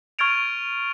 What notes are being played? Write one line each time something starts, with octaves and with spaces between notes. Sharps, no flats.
C#6 F6 G#6 A6 D7 F7